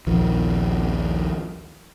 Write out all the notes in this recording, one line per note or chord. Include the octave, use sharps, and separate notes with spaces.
A#1 D#2 F3